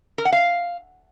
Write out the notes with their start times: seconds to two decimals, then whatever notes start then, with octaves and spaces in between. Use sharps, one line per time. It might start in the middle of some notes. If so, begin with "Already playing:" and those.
0.18 A#4
0.25 F#5
0.32 F5